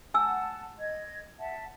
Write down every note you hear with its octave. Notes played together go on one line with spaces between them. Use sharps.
F#5 G#5 A5 E6
D#5 G#6
E5 F#5 A5